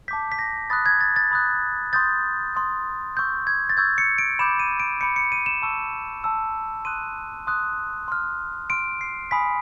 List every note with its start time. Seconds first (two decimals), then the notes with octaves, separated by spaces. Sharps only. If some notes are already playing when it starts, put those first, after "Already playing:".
0.08 A5 D6 G6 B6
0.32 B6
0.39 A#6
0.70 B5 D#6 F#6 A6
0.86 G#6
1.01 A6
1.16 A6
1.31 B5 D#6 F#6
1.93 C6 D#6 G6 A6
2.55 C6 D#6 G6
3.17 C#6 E6 G6
3.47 G#6
3.70 A6
3.77 C#6 E6 G6 G#6
3.98 C#7
4.18 D7
4.39 B5 D6 G6 E7
4.59 D#7
4.80 D7
5.01 B5 D6 G6 C#7
5.16 C#7
5.32 D#7
5.46 E7
5.62 A5 C#6 E6
6.24 A5 C#6 E6
6.85 C6 D#6 F#6 D#7
7.47 C6 D#6 F#6
8.08 C6 F6
8.70 C6 F6 D7
9.01 C7
9.31 G#5 B5 D#6 B6